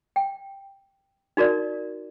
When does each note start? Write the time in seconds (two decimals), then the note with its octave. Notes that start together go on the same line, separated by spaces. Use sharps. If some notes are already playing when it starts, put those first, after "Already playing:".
0.16 G5
1.37 D#4 F#4 A#4 D5